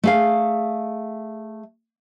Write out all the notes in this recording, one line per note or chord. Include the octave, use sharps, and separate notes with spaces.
A3 G#4 F5